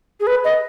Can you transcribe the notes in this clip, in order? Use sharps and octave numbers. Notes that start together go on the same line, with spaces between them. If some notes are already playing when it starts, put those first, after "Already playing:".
G#4
B4
D#5